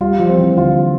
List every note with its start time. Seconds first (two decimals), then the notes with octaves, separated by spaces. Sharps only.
0.01 G3 F4
0.20 F3
0.29 C4
0.38 E3
0.57 D3 F4